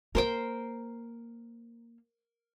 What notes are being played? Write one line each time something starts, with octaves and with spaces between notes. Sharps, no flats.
A#3 A#4 C5 G5